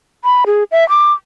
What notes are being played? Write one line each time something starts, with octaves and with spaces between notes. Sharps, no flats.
B5
G#4
E5
D6